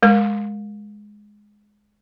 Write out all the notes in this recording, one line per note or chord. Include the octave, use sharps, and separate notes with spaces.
G#3 A#4